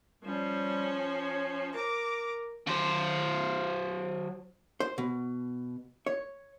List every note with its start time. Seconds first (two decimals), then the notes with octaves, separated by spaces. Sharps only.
0.23 F3 G3 C#4
1.20 C#5
1.74 A#4 A#5 D6
2.67 F#3 C5
4.80 C5
4.98 B2
6.06 C#5